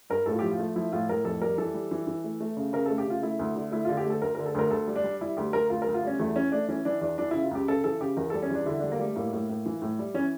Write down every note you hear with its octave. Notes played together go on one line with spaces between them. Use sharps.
G2 A#4
A2 A4
F4
G4
F3
F4
A3
F3 E4
A2 F4
A2 A#4
F2 A4
G3 A#4
E3 A4
G3
E3
E3
A3
A3
C#3
C#3 A#4
A4
A3
G4
C#3 F4
A3 E4
D2
D3
A3 E4
F4
D3
G4
A3 A4
D2 A#4
A#4
D3
A4
D2 A#4
D2 A4
G3
D4
G3
G3 E4
D2 G4
D2 A#4
D2 F4
A#4
D2
F4
G3 C#4
E2 A3
E3 C#4
A3 D4
E3 C#4
E3 D4
E2 D4
E3 D4
C#3 E4
F4
C#2 G4
C#3 A4
E3 A4
C#3 G4
E2 A#4
A4
G3
C#4
E2 D4
D3 E4
D4
G3
A#3
G3 A3
A2 A#3
A2
A2
E3
A2
G3
E3 C#4